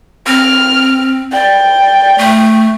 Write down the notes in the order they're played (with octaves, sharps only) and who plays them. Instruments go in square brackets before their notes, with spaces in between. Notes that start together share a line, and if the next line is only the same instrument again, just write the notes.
[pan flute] C4 [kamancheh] F6
[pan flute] D5 [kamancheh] G5
[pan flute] A3